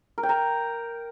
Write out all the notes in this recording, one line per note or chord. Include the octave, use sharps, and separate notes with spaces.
A#4
G5
A#5